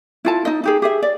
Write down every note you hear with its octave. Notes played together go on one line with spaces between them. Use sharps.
E4 F4 A5
D#4 D#5
D#4 G4 G#4
G4 G#4 E5
D5